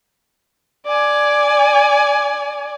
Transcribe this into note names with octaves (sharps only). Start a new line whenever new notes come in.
D5 G#5